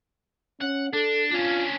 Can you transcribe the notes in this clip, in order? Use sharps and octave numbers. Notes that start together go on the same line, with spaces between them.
C#4 F#5
D4 A4
C#4 D4 F4